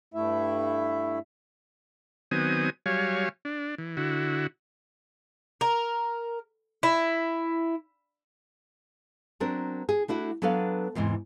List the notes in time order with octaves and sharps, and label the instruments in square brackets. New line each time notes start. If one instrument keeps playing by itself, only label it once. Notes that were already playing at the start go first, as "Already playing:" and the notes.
[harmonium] G2 A3 E4 E5
[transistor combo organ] D#3 F#3 B3 C4 G#5 D#6
F#3 G3 C#5 F5 G#5
D4
E3
D3 E4 F#4
[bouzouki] A#4
E4
[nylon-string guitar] F#3 C4 D4 A#4
G#4
A3 D4 E4 F#4
F#3 B3 D4 A4 B4 F5
E2 G#2 C3 E3